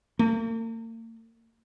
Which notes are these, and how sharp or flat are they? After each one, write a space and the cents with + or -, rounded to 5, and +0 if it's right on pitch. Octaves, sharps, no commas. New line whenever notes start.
A#3 -45